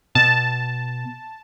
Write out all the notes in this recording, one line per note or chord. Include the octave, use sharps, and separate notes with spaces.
B2 A5